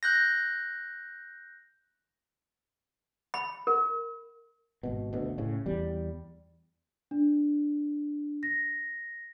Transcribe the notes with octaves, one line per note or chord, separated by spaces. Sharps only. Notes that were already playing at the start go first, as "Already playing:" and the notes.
F#6 G6 A#6
B5
A#4
G#1 B2
D2 B2
A2 C#3
E2 G3
D4
A#6